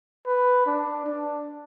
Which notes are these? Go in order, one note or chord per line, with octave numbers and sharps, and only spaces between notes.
B4
D4
D4